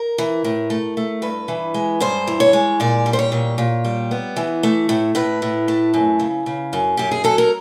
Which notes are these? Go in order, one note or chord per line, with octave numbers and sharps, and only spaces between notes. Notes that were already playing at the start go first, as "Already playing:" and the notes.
Already playing: A#4
E3
A2
A3
A3
G2 B4
E3
G#3
G2 C5
E3
C#5
G#3
A#2 D5
G3
C5
C#5
A#2
A#2
G3
B3
E3
A3
A2
A2 B4
A2
A3
F#2
C#3
C#3
F#2
F#2 G4
G#4
F#3 A4
A#4